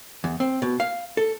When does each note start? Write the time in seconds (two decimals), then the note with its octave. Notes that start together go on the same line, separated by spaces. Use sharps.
0.24 E2
0.40 C4
0.62 B2
0.80 F5
1.17 A4